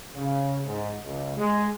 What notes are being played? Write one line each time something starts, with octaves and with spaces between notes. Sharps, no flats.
C#3
G#2
C#2
G#3